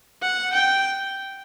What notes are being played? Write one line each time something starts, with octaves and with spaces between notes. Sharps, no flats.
F#5
G5